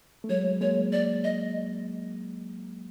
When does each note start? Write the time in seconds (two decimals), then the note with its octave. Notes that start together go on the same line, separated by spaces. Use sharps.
0.24 A3
0.29 F#3 G#3 C#5
0.61 G#3 A#3 C#5
0.92 D5
1.24 D#5